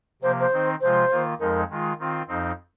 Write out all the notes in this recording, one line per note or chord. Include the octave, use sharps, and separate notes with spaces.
C3 F3 A#3 C5
C5
D#3 C4 D#4
C3 F3 G#3 F4 C5
D#3 A#3 F4
F2 F3 G#3 D#4 A#4
D#3 G#3 F4
D#3 C4 F4
F2 F3 C4 D#4